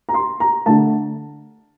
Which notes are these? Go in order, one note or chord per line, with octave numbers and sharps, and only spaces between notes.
A#5
C6
A#5
D3 A3 A5